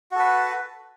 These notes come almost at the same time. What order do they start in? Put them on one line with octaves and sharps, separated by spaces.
F#4 A4 B4